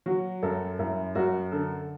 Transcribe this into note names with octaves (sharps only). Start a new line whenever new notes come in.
F#3 F#4
F#2 A4
F#2 E4
F#2 F#4
D3 A4